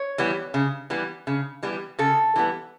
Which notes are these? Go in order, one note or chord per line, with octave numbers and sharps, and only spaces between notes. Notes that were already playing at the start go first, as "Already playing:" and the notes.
Already playing: C#5
E3 G3 B3
C#3
E3 G3 B3
C#3
E3 G3 B3
C#3 A4
E3 G3 B3